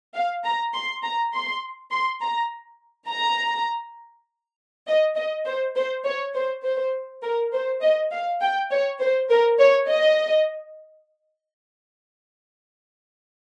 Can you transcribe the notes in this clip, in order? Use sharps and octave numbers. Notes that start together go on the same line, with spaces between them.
F5
A#5
C6
A#5
C6
C6
A#5
A#5
D#5
D#5
C5
C5
C#5
C5
C5
A#4
C5
D#5
F5
G5
C#5
C5
A#4
C#5
D#5